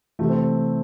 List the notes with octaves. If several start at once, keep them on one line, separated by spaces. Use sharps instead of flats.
C3 E3 A3
C4